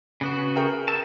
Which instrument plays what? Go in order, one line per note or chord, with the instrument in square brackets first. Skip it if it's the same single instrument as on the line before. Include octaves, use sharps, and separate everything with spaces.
[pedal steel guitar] C#3 B3 F#4
[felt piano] G#4 A#4 G5
[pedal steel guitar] E5 A5